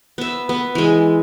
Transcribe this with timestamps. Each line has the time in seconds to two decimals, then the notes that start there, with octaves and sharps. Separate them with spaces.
0.18 B3 E5
0.49 B3
0.75 E3 G#3